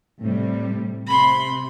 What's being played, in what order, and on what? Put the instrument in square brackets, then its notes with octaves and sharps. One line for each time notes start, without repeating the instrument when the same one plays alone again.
[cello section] A2 C3 G3
[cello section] C3 [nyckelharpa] B5 C6